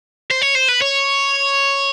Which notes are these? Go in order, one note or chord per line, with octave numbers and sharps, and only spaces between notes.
C5
C#5
C5
B4
C#5